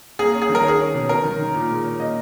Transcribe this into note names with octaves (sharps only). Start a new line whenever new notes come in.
A#3 G#4
C#4
G#4
D#3
A#4
C#4 G#4
C#4
B2
C#4 A#4
D#3
D#3
A#2
G#3
C#4
A#3 D#5